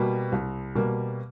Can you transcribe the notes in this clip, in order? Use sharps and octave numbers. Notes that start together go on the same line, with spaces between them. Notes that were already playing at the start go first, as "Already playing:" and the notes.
Already playing: B2 G3 A#3
C2
B2 G3 A#3